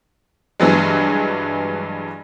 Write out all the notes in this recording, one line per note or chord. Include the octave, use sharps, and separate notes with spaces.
G2 E3 F#3 G#3